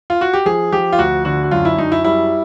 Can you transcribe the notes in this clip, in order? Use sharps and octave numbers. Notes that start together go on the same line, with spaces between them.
F4
F#4
G4
F3 G#4
F3 G4
F4
D2 F#4
D3 F#4
F#4
F#2 F4
E4
F#2 D#4
E4
G3 E4